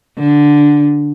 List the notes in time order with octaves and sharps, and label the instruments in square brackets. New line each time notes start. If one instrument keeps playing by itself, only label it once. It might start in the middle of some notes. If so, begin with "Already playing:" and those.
[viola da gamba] D3